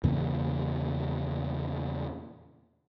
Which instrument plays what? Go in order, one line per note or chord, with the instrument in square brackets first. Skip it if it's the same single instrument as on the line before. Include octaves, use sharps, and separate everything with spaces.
[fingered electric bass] E2 A#2 C#3